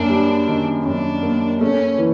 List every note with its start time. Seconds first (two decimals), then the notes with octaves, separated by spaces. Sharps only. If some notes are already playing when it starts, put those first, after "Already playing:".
Already playing: F#2 A#3 D4
0.09 G3
0.48 D#3
0.85 F#2 D4
1.23 A#3
1.61 A3 C#4
1.98 E3